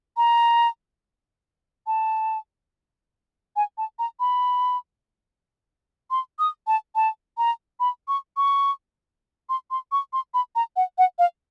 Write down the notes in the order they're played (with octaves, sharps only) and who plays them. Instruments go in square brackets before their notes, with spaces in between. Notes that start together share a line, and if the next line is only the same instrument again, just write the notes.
[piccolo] A#5
A5
G#5
A5
A#5
B5
C6
D#6
A5
A5
A#5
B5
C#6
C#6
C6
C6
C#6
C6
B5
A#5
F#5
F#5
F5